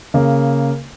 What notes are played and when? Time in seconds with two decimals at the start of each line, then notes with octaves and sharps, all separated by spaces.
0.14 C#3 A#3